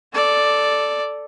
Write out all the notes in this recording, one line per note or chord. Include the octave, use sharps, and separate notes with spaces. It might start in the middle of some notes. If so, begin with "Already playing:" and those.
A4 D5